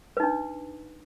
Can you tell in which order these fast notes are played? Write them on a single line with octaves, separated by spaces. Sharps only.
B4 D#4 D4